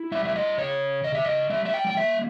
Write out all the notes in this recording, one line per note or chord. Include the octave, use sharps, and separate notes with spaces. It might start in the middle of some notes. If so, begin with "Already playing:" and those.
Already playing: E4
G3 E5
E5
D#5
C#3 C#5
C#3 D#5
E5
D#5
G3 E5
E5
G5
G5
A#3 E5